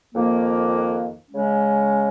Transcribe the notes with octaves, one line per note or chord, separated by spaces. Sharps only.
F2 D#3 A#3
C#3 G#3 C#4